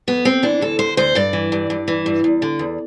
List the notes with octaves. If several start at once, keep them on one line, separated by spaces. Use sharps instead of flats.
F2 B3
F2 C4
E3 D4
D2 A4
D3 C5
D2 C5
G2 D5
E3
G2
G2
E3
G2
E2
D3
E2